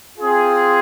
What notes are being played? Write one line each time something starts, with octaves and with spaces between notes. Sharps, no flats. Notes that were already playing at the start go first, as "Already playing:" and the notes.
C4 F4 G#4